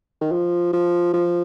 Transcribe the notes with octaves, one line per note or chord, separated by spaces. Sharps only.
D#3
F3
F3
F3